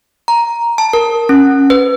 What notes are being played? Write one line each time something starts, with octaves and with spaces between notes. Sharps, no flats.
A#5
A5
A#4
C#4
B4